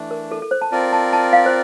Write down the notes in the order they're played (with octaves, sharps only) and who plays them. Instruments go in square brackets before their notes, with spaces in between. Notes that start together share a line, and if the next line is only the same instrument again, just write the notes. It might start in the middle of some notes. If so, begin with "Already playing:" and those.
Already playing: [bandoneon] E3 A3 D4
[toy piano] A#4
A4
A4
C5
A5
[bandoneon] C4 F4 A#4 D5 [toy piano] A5
[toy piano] A5
A5
F5
C5